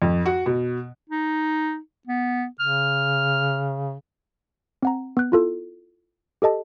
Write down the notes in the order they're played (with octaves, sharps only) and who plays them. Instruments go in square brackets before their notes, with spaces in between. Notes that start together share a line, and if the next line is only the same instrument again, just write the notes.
[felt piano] F2
F#4
B2
[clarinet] D#4
B3
[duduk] C#3 [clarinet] F6
[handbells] C4 F#5 A#5
B3 F#6
E4 F4 A4
G4 A4 D#5 A5